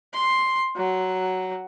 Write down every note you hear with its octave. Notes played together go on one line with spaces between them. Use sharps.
C6
F#3